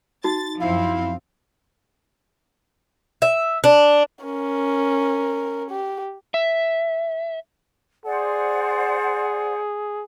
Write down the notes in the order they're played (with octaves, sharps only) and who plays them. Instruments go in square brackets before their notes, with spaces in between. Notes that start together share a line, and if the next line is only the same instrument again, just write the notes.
[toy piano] D#4 F#4 [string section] A6
[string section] F#2 F3 C4 [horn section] E4 [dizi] F5
[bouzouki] E5
D4
[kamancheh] C#4 A#4
G4
[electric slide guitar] E5
[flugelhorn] G#4 [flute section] C5 D5 F#5